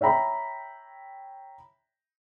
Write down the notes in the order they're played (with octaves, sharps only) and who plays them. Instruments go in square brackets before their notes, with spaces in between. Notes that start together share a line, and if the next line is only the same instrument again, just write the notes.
[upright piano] C#5 E5 G5 A#5 B5